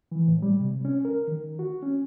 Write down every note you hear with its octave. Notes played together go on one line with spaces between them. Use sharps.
E3
A2
G3
C3
C#4
A#4
D#3
F#4
C#4